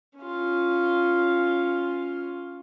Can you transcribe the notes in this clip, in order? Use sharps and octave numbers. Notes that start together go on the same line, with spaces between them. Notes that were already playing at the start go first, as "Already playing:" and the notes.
C#4 F4